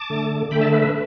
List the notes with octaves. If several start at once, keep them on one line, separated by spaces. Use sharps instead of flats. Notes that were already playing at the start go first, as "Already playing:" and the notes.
Already playing: A5 D6
D3 A3
D3 A3 G5 B5
E5 A5
B4 E5
B4 E5